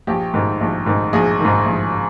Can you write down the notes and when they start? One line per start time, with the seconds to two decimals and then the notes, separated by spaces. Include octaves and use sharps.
0.07 A#1 G4
0.34 G#2 D#3
0.61 A#1
0.86 G#2 D#3
1.13 A#1 G#4
1.40 G#2 D#3
1.66 A#1